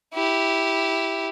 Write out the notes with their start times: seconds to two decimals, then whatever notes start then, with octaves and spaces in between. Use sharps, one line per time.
0.14 E4 G4